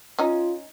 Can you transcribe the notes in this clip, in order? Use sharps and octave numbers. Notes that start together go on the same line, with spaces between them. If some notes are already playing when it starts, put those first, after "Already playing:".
C#4 D#4 F4